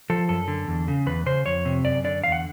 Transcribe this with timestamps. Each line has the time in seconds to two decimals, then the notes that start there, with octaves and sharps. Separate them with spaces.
0.10 F3 A4
0.29 F#2 A4
0.48 D3
0.67 E2
0.88 C#3
1.06 E2 B4
1.26 C#3 C5
1.46 F2 C#5
1.65 C3
1.85 F#2 D5
2.04 D3 D5
2.24 E2 F5
2.32 F#5